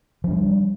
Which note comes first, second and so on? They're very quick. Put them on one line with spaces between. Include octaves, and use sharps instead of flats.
F3 D4 G3